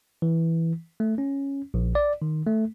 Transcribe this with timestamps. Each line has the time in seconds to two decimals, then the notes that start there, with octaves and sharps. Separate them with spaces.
0.22 E3
1.00 A3
1.18 C#4
1.74 A#1
1.95 D5
2.22 D#3
2.46 A3